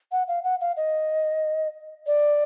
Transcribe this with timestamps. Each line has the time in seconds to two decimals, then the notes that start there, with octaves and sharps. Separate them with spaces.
0.12 F#5
0.28 F5
0.44 F#5
0.61 F5
0.77 D#5
2.07 D5